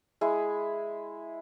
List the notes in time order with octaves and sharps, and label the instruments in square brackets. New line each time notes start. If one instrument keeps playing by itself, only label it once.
[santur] G#3 E4 G#4